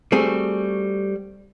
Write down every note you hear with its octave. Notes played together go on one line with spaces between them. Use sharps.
G3 A3 C4 F#4 G#4